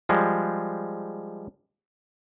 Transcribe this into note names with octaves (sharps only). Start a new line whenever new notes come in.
F3 G3 G#3